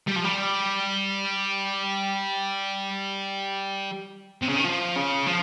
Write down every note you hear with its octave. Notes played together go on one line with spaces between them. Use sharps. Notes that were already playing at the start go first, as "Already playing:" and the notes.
G3
F3
G3
C3
C#3
D#3
F3
C#3
F3